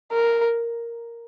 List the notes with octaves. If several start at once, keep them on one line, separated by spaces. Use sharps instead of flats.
A#4